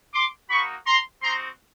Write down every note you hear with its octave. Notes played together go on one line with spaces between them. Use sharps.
C6 D6
A#3 D#4 F#4 B5 C#6
A#5 C6
C4 D#4 F#4 A#5 C6